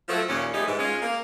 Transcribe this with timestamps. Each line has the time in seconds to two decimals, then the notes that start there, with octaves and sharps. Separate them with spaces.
0.09 F3 F#3 A3
0.29 D#2 A#2 C#4
0.54 F3 G3 A3 D#4 G4 G#4
0.67 G#2 E3
0.79 G#3 C#4 F4
1.02 A#3